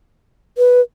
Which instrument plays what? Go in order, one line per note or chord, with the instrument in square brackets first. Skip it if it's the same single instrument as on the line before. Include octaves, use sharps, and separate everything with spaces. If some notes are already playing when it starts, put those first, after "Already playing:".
[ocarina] B4